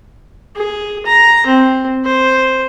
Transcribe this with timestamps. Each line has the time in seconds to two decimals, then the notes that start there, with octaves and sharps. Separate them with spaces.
0.56 G#4
1.06 A#5
1.46 C4
2.05 C5